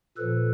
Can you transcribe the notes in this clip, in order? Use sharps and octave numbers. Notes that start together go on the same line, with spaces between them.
A#2 F3 A4 B4